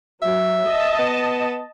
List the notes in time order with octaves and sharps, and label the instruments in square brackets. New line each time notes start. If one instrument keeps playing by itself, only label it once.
[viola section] F#3 [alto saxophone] E5
[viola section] D#5 A5
[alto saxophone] B3